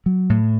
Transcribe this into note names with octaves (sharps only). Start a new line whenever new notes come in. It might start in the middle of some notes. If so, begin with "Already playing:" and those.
F#3
A2